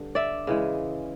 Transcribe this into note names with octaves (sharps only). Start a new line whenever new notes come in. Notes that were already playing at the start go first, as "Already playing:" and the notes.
Already playing: G2 D3
D5 E5
C#3 E3 G#3